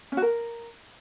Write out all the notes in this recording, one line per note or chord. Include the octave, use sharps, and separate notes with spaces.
C#4
F#4
A#4